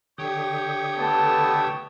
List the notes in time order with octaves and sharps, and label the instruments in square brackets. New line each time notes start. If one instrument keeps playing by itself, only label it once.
[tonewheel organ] D3 G4 D#6 [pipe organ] C#5 G5
[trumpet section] A3 B3 A5